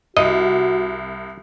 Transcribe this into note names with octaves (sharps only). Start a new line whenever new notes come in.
C2 F#4 D#5